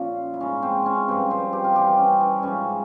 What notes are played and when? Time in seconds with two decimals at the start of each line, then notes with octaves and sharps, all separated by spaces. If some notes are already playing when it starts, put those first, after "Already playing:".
Already playing: A#2 F3 C#4
0.34 E4
0.40 G#2 F3 C#4
0.63 C4
0.86 C#4
1.08 G2 F3 C4
1.31 C4
1.53 G4
1.64 F4
1.76 G2 E3 G4
1.98 C#4
2.21 E4
2.43 G#2 F3 C#4